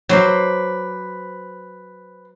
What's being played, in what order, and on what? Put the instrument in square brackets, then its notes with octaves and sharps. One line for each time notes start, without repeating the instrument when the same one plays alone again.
[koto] F#3 [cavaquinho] B4 C5 D6